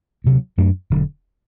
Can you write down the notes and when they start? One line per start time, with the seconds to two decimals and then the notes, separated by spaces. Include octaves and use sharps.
0.24 D2 C3 F#3
0.58 F#2 F#3 A3 D4
0.90 E1 D3 F#3